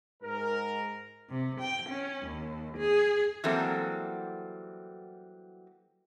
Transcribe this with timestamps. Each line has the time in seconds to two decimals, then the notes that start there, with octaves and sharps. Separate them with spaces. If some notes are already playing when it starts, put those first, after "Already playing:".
0.23 G#2 A#4
1.30 C3
1.61 G5
1.90 C#4
2.26 D#2
2.78 G#4
3.44 E3 F#3 G3 A#3 C4 A4